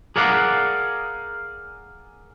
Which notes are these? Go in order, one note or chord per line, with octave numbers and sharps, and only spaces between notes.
G#4 A#4 D5 F5 F#5